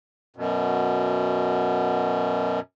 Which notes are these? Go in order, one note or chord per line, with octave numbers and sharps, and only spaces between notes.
F#2 B2